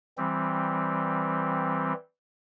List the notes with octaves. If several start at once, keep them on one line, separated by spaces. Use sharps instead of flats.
E3 G3 C4